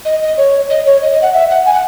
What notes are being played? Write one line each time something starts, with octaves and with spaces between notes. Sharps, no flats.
D#5
D#5
C#5
D#5
C#5
D#5
D#5
F#5
E5
F#5
G#5
F#5